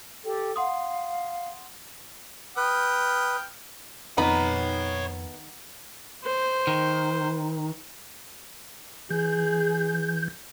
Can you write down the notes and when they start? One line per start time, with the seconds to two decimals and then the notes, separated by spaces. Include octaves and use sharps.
0.24 G4 A4 G5
0.56 F5 F#5 C6 D#6
2.57 B4 G5 D#6 F6
4.18 F2 D#3 B3 D#4 C#5 A#5 B5
6.25 C5
6.67 D#3
9.10 E3 G#4 G6